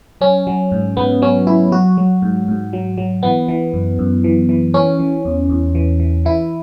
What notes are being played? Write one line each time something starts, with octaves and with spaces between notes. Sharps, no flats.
F#3 C#4
F#3
G#2
G#2 B3
F#3 C#4
F#3 E4
F#3 F#4
F#3
G#2
G#2
F#3
F#3
E3 B3
E3
F#2
F#2
E3
E3
E3 C#4
E3
E2
E2
E3
E3
E3 E4